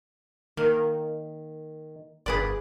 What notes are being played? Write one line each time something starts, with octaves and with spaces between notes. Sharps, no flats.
D#3 A#3
G1 G#4 B4 D5